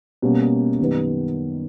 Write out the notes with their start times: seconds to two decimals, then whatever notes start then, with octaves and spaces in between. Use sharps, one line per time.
0.22 B2 G3 A#3 C#4
0.79 F#2 D#3 G3 B3